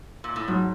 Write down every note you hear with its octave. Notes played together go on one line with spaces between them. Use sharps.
A#2
A2
G#2 F#3